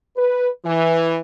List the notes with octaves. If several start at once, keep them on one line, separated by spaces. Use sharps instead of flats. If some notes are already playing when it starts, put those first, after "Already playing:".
B4
E3